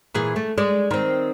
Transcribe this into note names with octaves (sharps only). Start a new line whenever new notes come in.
A#2 E3 G#4
A3
G#3 D5
D#3 C4